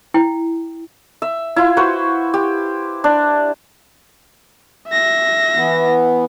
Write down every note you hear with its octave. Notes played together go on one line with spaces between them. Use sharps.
E4 G5
E5
E4 F4
F#4 B4 C5
G4
D4
E5 A#6
E3 B3